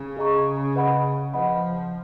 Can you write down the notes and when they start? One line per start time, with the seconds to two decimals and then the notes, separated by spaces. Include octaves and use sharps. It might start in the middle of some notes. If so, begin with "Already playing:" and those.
Already playing: C#3
0.17 G#4 D#5 A#5 C#6
0.75 B4 D#5 F#5 B5
1.34 F3 B4 D#5 F#5 B5